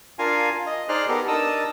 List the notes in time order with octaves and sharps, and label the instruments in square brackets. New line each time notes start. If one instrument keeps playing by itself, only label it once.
[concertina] D4 F4 A#4 F5 G#5
D#5
D#4 G#4 C5 D5 F6 F#6
B3 G4 A4 A#4
D4 D#4 A#4 A5 D#6 E6